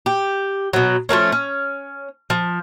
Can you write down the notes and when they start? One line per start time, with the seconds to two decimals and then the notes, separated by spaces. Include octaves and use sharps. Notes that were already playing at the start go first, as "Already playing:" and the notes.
0.06 G4
0.73 B2 F#3
1.09 F3 A3 A#3 C#4
1.32 C#4
2.30 F3